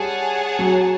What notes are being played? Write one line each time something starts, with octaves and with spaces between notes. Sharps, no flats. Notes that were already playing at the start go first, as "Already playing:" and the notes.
Already playing: G3 G#4 C#5 F#5 A5
F#3